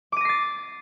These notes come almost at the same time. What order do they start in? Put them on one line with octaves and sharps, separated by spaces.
D6 D#7 A#6 C7 A6